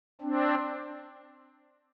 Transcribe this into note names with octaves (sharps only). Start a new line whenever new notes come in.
C4 D4